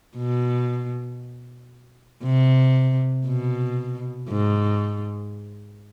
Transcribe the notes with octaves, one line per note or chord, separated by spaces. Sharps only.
B2
C3
B2
G#2